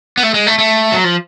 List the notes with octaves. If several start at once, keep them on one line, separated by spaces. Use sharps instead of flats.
B3
A3
G#3
A3
A3
F#3
F3